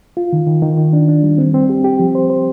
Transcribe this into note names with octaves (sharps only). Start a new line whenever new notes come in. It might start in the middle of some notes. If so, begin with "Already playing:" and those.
F4
D#3
D#3
D#3
D#3
D4
D4
G3
C4
C4
G4
G4
F3
C5
C5